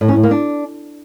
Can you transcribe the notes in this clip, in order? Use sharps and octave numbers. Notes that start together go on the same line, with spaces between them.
A2
C#4
A2
A#3
D4